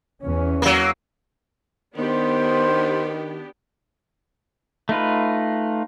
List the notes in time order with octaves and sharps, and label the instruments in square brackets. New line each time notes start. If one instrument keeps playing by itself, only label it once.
[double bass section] E2 C#4
[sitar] F#3 A#3
[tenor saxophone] D#3 [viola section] B3 D4 G4 [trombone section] C5
[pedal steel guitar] A3 D#4 F4 B4